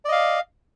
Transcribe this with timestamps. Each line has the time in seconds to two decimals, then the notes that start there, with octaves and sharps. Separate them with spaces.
0.05 D5
0.09 D#5
0.12 F5